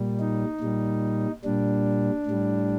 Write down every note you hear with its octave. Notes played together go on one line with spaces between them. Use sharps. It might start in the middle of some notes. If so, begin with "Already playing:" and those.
Already playing: A#2 G3
D#4
A#2 G3
A#2 G3 D4
A2 G3